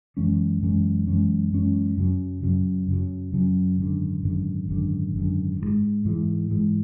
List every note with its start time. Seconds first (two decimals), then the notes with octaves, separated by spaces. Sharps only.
0.17 F#2 E3 G#3 C#4
0.62 F#2 E3 G#3 C#4
1.07 F#2 E3 G#3 C#4
1.52 F#2 E3 G#3 C#4
1.97 F#2 C#3 F#3
2.43 F#2 C#3 F#3
2.88 F#2 C#3 F#3
3.33 F#2 C#3 F#3
3.79 G#1 F#2 D3
4.23 G#1 F#2 D3
4.69 G#1 F#2 D3
5.14 G#1 F#2 D3
5.60 G#2 E3 G#3
6.05 G#2 E3 G#3
6.50 G#2 E3 G#3